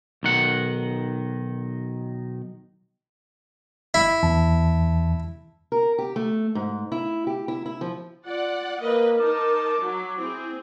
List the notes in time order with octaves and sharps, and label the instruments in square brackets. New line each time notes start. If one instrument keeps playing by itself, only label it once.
[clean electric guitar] B1 D#3 F#5
[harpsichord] E4
[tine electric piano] E2 E3 A5
[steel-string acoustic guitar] A#4
G4
A3
G#2
E4
G4
E4
E4
F3
[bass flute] F4 [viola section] D5 F#5
[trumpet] A#3 [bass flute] A#4 [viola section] B4 D#5
[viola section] D#4 A5 [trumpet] D6
[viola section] F#3
[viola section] C4 G#4 [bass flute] E4